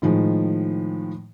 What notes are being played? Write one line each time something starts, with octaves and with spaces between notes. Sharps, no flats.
A2 D#3 F3 G#3